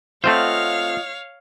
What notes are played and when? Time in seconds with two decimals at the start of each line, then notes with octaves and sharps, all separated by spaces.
0.24 A3 C4 F4 C5 C#5 D#5 F5 F#5